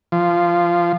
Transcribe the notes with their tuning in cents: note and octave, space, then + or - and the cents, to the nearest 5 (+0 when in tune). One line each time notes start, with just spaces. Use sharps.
F3 -10